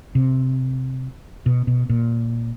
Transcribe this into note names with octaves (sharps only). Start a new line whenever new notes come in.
C3
B2
B2
A#2